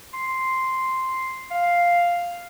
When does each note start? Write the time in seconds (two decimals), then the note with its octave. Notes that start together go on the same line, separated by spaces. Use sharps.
0.13 C6
1.51 F5